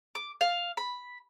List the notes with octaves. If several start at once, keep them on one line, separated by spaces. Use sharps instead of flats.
D6
F5
B5